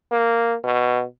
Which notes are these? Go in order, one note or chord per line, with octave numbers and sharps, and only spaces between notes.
A#3
B2